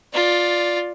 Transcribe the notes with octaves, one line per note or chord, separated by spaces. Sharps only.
F4 D5